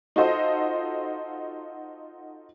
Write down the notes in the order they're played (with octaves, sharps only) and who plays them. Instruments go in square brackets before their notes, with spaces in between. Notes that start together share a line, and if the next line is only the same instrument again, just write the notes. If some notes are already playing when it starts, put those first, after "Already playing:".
[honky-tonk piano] D#4 F4 F#4 A4 C5 D#5